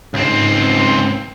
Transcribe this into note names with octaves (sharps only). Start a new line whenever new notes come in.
C#2 G#2 C4